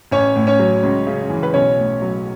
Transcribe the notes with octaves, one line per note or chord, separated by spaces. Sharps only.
A1 C#4 C#5
A2
C#4 C#5
F#3
C#2
C#3
E3
B4
B1 C#4 C#5
A2
F#3